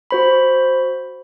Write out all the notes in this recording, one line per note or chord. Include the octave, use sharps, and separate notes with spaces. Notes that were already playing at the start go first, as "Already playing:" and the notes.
F#4 C5 B5